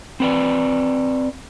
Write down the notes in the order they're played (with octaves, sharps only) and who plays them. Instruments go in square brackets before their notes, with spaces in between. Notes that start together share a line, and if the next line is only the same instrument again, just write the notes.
[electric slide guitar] C4 B4 D5